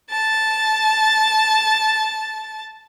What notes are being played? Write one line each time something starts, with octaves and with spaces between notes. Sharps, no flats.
A5 A6